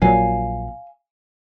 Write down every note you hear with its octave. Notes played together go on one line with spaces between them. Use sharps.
A#1 A#2 F#3 F5 G#5